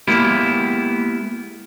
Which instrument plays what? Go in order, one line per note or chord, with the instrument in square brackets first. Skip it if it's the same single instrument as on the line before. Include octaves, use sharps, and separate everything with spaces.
[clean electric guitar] G#3 A#3 B3 E4 G4